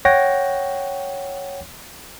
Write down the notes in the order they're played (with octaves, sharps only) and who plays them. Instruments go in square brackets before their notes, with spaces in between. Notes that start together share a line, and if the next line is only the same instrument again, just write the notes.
[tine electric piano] C#5 F#5 G5 A#6